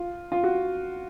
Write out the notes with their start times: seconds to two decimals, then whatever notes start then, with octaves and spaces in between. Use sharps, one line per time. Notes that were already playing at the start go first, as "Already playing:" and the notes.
Already playing: F4
0.32 F4
0.44 F#4